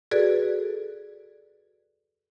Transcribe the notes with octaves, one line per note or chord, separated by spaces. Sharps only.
F#4 G#4 A4 B4 D5